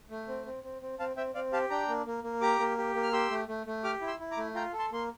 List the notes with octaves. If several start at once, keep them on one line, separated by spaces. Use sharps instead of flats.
A3
C4
C4
C4
C4
C4 F5 A5
C4 E5 G5
C4 D5 F5
G4 F5 A5
D4 G5 A#5
A#3
A#3
A#3
G4 A#5 D6
A#3
G4
A#3
F6
G4 C6 E6
A3
A3
A3
G4 D6 F6
E4
C6 E6
E4
A#5 D6
A3
F4 G5 A#5
A4
A5 C6
A#3 C6